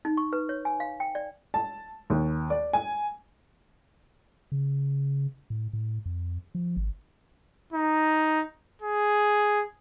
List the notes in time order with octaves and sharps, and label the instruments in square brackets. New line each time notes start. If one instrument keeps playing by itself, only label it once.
[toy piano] D#4
C#6
B4
C#5
G#5
F5
G5
D5
[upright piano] A5
D#2
D5
G#5
[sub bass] C#3
A2
A2
F2
F3
G#1
[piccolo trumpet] D#4
G#4